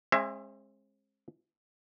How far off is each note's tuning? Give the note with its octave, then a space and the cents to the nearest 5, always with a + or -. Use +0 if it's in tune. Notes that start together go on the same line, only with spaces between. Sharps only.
G#3 +0 C4 +45 E5 +25